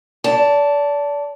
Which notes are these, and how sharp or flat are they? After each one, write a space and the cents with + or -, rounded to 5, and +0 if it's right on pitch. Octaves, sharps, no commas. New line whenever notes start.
D5 -30 A5 +0